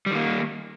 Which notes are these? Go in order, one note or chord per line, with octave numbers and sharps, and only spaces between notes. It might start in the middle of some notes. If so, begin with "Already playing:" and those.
D#3 G3 A#3